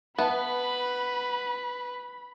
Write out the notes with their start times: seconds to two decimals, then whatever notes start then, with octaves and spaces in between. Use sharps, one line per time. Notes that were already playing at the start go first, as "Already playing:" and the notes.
0.18 B3 B4 E5 A5 B5